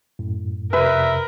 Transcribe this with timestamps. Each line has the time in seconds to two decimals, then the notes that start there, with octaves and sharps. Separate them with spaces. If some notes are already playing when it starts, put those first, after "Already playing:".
0.19 F#2 A2
0.73 F2 C3 A#4 B4 E5